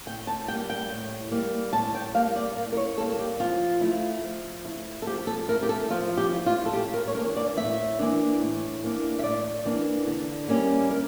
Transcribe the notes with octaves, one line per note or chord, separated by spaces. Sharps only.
A2 G5
A5
G3 A#3 G5
G5
A2
G3 A#3
A2 A5
G5
G3 A#3 F5
D5
A2 A#4
A#4
C#5
G3 A#3 A4
G4
F3 F4
A3 E4
F3
A3 E4
A4
F3 G4
A4
A3 E4 A#4
G4
A4
F3 F4
G4
A3 E4
F4
A4
A2 G4
A#4
C#5
E3 A#3 D4 A#4
D5
A2 E5
E3 A#3 D4
A2
E3 A#3 D4
E5
A2 D5
E3 A#3 D4
D3
G3 A#3 C#4 E4
D3 A#4